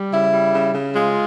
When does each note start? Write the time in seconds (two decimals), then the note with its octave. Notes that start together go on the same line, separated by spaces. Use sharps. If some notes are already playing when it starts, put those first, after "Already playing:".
Already playing: G3
0.12 C#3 E4
0.32 G3
0.53 C#3
0.74 C#3
0.95 G#3 F4